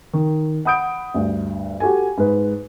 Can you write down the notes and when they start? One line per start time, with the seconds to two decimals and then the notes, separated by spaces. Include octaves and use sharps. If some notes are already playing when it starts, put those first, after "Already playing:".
0.14 D#3
0.65 F#5 B5 D#6 G6 D7
1.14 D2 G2
1.80 F#4 G4 A4 G#5
2.18 G#2 B4